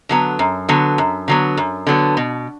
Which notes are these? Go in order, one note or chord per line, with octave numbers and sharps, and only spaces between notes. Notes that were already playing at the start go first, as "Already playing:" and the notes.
D3 F#3 B3
F#2
D3 F#3 B3
F#2
D3 F#3 B3
F#2
D3 F#3 B3
B2